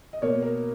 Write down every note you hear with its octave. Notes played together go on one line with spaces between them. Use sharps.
D#5
B2 A#3 C#5
A#4